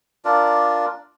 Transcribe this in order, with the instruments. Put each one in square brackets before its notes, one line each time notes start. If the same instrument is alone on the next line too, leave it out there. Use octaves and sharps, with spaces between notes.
[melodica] D4 F4 A#4 D5